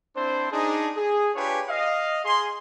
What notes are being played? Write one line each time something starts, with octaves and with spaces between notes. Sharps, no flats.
C4 D4 E4 C5
D4 D#4 G#4
G#4
D4 F4 G4 B4 C#5 G#5
D#5 F5
G#4 C6